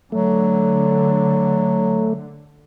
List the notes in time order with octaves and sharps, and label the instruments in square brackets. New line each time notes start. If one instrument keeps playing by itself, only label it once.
[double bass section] D3 [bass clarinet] F#3 [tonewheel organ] A3